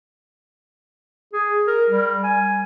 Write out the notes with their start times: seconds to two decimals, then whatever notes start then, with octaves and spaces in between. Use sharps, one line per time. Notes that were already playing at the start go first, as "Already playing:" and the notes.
1.33 G#4
1.67 A#4
1.90 G3
2.24 G#5